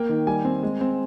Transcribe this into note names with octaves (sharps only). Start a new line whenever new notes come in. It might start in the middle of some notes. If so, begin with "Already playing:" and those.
Already playing: A#3 G5
D#3
G3 G#5
C4
G#3
C4